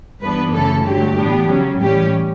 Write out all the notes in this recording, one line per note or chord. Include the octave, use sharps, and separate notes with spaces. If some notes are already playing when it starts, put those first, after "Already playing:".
G2 E3 B3 D4 B4
F#2 C#3 E3 A3 A4
G2 D3 F#3 A3 G4
A2 E3 B3 D4
C#3 F#3 C#4
A2 E3 G3 C#4 G4